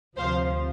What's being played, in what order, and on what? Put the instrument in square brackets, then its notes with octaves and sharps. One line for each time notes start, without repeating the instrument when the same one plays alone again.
[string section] D2 C3 F3 C5 F5